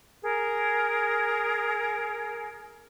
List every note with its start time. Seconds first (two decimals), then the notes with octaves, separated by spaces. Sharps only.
0.23 G#4 A#4